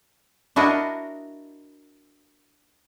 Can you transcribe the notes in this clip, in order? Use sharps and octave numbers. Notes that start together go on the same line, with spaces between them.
D4 E4 F#4 A#4 D#5